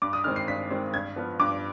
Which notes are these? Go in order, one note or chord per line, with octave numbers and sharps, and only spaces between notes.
G2 D6
D#6
D#3 G#3 C4 F6
C7
G2 B6
D#3 G#3 C4
G2 G#6
F3 B3
G2 D6